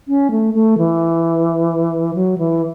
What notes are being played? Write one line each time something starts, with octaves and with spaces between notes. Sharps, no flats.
C#4
A3
A3
E3
F#3
E3